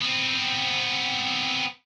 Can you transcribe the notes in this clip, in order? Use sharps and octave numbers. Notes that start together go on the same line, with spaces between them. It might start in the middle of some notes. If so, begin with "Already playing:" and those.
B3 C4